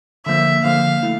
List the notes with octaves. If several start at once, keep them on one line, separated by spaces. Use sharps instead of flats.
D3 F3 A#3 E5
D3 F3 A#3 F5
A3 E4